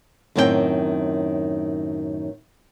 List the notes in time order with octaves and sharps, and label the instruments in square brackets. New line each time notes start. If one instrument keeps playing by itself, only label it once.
[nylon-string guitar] F#2 A2 D#3 C4 A#4 G5